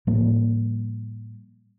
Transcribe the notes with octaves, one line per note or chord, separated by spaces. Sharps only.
A2 F3 G3 A#3